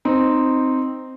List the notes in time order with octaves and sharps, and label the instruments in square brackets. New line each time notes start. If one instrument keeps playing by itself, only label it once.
[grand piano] C4 D#4